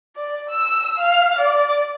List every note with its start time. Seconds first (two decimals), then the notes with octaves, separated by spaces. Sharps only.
0.16 D5
0.50 E6
0.98 F5
1.39 D5